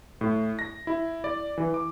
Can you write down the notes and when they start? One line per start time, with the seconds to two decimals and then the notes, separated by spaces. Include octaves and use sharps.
0.21 A2
0.59 A#6
0.87 E4
1.24 D5
1.58 E3
1.74 D6